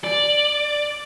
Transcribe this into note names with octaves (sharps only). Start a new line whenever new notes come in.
D5